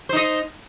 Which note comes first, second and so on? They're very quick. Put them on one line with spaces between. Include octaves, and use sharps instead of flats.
C5 D#4 D#5